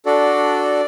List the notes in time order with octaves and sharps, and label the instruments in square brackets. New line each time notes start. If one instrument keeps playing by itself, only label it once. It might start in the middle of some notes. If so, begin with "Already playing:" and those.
[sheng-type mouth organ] D4 F#4 A4 D5